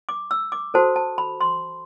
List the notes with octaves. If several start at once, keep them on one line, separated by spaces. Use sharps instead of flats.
D6
E6
D6
F#4 A4 C5 A5
A5
B5
C6